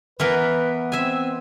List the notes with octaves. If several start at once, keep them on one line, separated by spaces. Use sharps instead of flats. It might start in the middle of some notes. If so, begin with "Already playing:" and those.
E3 B3 A#4 B4
C4 E5 G#5